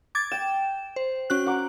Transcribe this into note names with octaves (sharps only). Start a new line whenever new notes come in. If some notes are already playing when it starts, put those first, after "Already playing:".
D6 G#6 A6
G5 E7
C5
C#4 F#4 F#6
F#5 A#5 D6